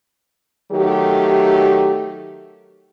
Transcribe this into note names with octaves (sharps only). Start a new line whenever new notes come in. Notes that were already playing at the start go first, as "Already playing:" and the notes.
D#3 F#3 A3 G4